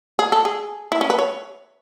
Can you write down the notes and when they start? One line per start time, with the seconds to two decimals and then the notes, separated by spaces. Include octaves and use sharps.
0.19 G#4
0.32 A4
0.45 G#4
0.92 E4
1.01 C#4
1.10 B4
1.19 C#5